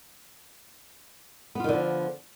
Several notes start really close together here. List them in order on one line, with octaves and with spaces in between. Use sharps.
B3 F4 D#3 D3 F3